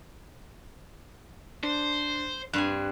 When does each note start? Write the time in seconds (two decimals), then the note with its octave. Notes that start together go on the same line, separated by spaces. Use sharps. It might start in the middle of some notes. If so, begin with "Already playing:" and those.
1.63 D4 C5
2.53 G2 C4 G#5 F#6